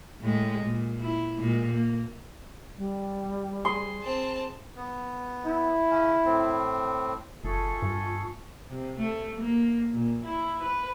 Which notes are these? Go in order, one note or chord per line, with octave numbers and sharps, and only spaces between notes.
A2 G#3
A#2
E4
A#2 G#3
A#3
G3
G#4 C6
C4 A5
B3
E4
C#3 C#4
A2 C4
F#1 A3 F4 G#4 A4 C#6
G2
C3
A3
A#3
A#2
E4
B4